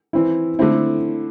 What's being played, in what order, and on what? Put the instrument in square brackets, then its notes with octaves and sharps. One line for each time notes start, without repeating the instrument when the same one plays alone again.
[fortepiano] E3 C4 E4
D3 A3 C4 E4